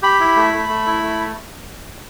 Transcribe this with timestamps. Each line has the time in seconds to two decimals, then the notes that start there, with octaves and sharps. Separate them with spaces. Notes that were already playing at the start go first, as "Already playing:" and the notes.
0.03 G4 B5
0.20 E4
0.36 A3
0.54 A3
0.69 A3
0.87 E4
1.03 A3